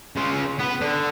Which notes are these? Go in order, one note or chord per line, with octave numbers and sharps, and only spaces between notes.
C#3 F4
B3
D3